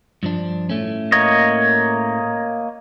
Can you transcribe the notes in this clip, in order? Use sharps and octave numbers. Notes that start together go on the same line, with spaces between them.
G2 F3 D4
A2 A3 C#4
A#3 C#5 D#5